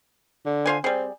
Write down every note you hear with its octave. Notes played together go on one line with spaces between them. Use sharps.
D3
F4 C5 G#5
G3 C4 G#4